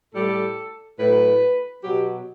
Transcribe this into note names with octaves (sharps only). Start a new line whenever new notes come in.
A2 G3 A4
A2 F#3 B4
B2 F#3 G4